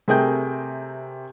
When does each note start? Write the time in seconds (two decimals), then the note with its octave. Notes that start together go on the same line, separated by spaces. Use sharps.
0.08 C3 A3 G#4 A#4 G5 G6